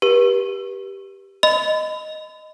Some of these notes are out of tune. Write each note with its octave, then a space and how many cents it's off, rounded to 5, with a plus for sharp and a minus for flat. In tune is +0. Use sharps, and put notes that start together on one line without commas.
G4 +0 B4 -40
D#5 +0 B5 +35